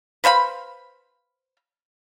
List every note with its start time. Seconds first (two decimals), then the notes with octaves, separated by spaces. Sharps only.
0.24 B4 C5 F5 B5